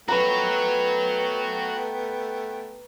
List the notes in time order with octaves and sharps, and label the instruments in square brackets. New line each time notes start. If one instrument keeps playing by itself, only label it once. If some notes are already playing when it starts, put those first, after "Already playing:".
[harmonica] A3 B3 G5 [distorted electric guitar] F#4 C#5 [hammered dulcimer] B4 A#5